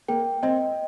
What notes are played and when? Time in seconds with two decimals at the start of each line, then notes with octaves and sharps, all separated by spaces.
0.08 A#3 G5
0.43 C4 D#5